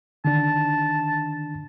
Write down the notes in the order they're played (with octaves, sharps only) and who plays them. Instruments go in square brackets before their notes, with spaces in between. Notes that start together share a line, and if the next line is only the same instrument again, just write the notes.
[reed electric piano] D3 D#3 D4 [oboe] A5